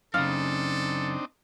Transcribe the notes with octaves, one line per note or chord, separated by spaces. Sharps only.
F#2 C#3 C4 D4 D#4 A4 F5